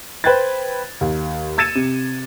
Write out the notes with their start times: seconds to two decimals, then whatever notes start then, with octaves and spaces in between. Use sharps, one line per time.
0.24 B4 C5 G5 F#6 G#6 A6
1.01 D#2
1.58 E6 G#6 A6 C#7 D#7 E7
1.75 C3